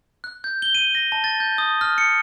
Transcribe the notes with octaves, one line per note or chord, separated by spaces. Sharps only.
F#6
G6
G7
D#7
A#6
A5
A6
G6
D#6
F6
C#7